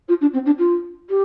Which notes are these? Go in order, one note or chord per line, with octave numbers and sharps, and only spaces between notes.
F4
D4
C4
D4
F4
G4